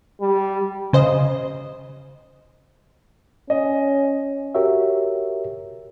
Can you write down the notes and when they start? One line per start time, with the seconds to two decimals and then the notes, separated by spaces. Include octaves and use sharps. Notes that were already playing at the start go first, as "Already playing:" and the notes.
0.21 G3
0.93 C#3 C5 D#5
3.50 C#4 D#5
4.55 F#4 G4 A#4 C#5 E5